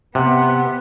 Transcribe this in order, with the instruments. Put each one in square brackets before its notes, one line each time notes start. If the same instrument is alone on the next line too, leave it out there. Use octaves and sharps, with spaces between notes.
[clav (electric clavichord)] C3 [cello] B3 [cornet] F#5